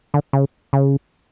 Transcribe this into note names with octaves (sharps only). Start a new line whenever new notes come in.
D3
C#3
C#3